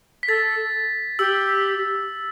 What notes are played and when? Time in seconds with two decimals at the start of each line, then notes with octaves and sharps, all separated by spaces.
0.23 B6
0.28 A4 A6
1.19 G4 E6